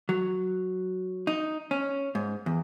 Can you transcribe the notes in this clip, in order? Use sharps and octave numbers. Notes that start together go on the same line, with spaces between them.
F#3
D#4
C#4
G#2
E2